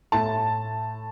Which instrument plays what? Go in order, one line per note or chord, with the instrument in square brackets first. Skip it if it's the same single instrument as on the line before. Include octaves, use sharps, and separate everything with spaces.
[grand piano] A2 A3 A5